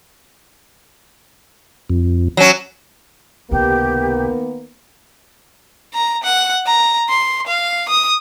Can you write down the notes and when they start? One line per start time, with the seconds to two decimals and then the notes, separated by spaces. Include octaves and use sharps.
1.90 F2
2.37 F#3 C#4
3.51 C#2 C3 D#3 A#3 B3 G4
5.94 A#5
6.24 F#5
6.66 A#5
7.09 C6
7.47 F5
7.89 D#6